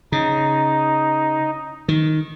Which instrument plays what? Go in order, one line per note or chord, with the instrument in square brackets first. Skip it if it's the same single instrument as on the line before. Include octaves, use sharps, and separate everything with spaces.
[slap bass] C#3 [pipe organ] D#4
[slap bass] D#3